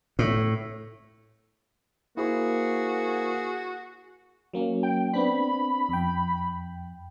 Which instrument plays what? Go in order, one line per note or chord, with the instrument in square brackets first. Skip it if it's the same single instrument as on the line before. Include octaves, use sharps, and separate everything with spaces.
[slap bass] A2
[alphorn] A#3 [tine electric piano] E4 C5 C#6 [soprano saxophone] F#4 [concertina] G#4
[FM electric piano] F#3 A#3 C#4
[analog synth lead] G5
[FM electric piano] B3 C4 D4 [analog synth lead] B5
[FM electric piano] F2 G5